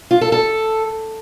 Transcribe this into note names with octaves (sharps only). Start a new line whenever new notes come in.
F4
A4
A4